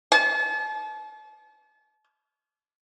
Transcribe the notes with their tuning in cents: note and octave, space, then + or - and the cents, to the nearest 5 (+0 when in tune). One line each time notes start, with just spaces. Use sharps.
A5 -40